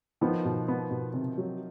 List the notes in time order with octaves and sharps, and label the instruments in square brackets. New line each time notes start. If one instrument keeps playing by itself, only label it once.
[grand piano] D#3 F3 [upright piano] B3
[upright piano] B2
B3
B2
C3
F#3